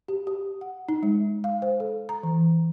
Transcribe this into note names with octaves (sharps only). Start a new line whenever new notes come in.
G4
G4
F#5
D#4
G#3
F5
C5
A4
A#5
E3